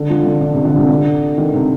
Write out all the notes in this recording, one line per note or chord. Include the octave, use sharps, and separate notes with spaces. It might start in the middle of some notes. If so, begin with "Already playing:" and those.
Already playing: D3
F3
D3
D3
C3
D3
C3
D3
D#3
C3